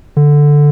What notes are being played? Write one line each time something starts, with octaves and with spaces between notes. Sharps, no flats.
D3